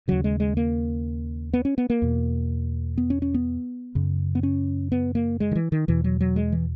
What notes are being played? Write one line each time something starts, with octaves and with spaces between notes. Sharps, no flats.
D#2 C#3 F#3
G#3
G#3
A#3
B3
C#4
B3
A#3
E2 B2
B3
C#4
C#4
B3
F#2 C#3
B3
C#4
B3
A#3
G#3
D#3
E3
D#3
E2 B2 E3
F#3
F#3
G#3
E3